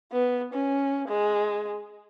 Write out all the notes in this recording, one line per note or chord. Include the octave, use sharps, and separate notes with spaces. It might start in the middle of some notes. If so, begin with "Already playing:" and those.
B3
C#4
G#3